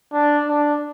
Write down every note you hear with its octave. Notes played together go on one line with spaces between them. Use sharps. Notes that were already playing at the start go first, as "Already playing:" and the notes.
D4
D4